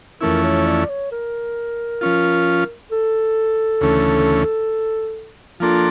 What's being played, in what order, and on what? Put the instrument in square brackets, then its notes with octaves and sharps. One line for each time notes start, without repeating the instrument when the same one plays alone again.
[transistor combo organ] F2 E3 A3 C#4 E4 [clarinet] A#4
[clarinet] C#5
D5
C#5
A#4
[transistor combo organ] F3 C#4 F4
[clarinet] A4
[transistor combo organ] D2 C#3 E3 A3 C#4
[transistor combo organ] F3 A#3 D4 A4 [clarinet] F4